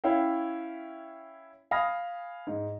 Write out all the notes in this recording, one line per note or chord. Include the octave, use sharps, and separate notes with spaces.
C#4 E4 C#5 E5 F5 G5
F5 G#5 B5 D#6 F6 A#6
G#2